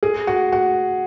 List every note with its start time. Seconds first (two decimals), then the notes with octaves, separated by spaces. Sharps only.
0.03 G#4
0.27 F#4
0.52 F#4